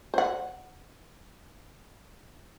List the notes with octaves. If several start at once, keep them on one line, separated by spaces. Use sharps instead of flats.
C5 F#5